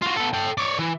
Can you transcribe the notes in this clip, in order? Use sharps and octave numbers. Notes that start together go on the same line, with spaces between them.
F4 F#4
B3 A4
A4 G5
C#5 D5
E3